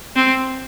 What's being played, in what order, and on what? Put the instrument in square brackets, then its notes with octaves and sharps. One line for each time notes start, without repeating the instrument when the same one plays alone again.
[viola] C4